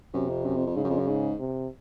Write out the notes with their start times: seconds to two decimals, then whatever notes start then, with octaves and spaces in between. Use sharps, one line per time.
0.14 F#2 C3
0.29 F2
0.45 F#2
0.56 F2
0.66 F2
0.76 G#2 C#3
0.84 F#2
0.90 F2
0.98 F#2
1.08 G#2
1.39 C3